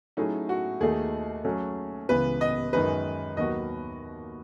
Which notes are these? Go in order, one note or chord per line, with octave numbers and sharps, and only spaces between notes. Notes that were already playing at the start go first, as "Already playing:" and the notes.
F#3 A3 C#4 D#4 E4 G#4
F#4
D#2 D#3 A3 D#4 G#4
F#3 A3 C#4
C#2 C#3 E3 B3 B4
D#5
F#2 D#3 G#3 D#4 B4
D#2 D#3 F#3 B3 F#4 D#5